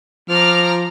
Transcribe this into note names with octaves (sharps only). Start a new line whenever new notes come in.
F3 A#5 D6 F6